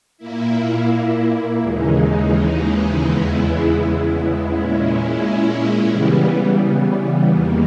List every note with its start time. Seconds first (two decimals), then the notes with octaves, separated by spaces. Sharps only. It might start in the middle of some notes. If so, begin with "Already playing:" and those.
0.18 A#2 A#3 E4
1.61 D#2 C#3 E3 G#3 D#4
3.03 E2 C#3 G#3 B3 E4
4.46 A#2 G#3 C#4 E4
5.89 C#3 E3 G3 B3
7.32 E2 D#3 A#3